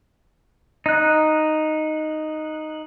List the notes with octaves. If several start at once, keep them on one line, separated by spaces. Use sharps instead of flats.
D#4 F#6